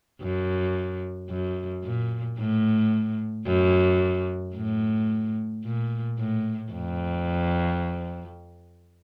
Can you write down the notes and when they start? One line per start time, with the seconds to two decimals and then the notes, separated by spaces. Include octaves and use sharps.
0.22 F#2
1.30 F#2
1.84 A#2
2.38 A2
3.47 F#2
4.55 A2
5.64 A#2
6.19 A2
6.72 F2